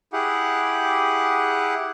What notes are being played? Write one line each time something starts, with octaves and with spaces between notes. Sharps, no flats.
E4 G4 G#4 F#5